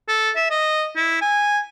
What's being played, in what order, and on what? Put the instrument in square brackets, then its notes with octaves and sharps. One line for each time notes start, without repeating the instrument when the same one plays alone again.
[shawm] A4
E5
D#5
E4
G#5